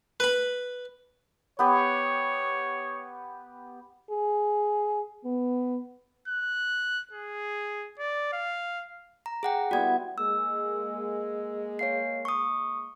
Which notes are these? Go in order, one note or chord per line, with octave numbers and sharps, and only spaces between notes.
B4 B5
B3 G4 B4 C#5
G#4
B3
F#6
G#4
D5
F5
A#5
G#4 F#5 G5
G3 B3 E4 F#4 G#6
G#3 A#3 E6
C#5 F5 C7
C#6 D#6